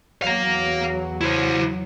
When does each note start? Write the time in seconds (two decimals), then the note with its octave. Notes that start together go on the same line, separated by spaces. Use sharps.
0.22 E2 F#3 F5 A#5
1.21 E4 C5